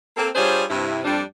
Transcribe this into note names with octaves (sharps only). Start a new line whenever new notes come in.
A#3 C4 A4
G3 D4 F4 G#4 C5 C#5
G2 C3 E4
F2 G3 D4